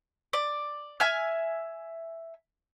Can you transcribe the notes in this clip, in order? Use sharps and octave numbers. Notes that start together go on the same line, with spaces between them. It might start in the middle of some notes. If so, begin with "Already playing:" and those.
D5
E5 G#5 F6